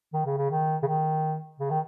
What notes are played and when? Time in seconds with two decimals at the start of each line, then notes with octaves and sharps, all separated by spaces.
0.13 D#3
0.26 C#3
0.38 C#3
0.51 D#3
0.83 C#3
0.86 D#3
1.60 C#3
1.70 D#3